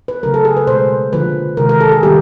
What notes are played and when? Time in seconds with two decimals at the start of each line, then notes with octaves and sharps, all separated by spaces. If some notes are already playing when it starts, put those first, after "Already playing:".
0.08 B4
0.23 C#3 F#3 A3 A#4
0.34 A4
0.45 G#4
0.57 B4
0.67 B2 G#3 C5
1.12 D3 F3 A#3 B4
1.57 C3 D#3 G#3 A#4
1.69 A#4
1.81 A4
1.92 G#4
2.03 D#3 G3 A#3 G4